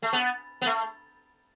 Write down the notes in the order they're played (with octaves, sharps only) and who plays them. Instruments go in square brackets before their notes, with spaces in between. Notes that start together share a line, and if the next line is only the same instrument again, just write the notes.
[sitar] A3
B3
B3
A3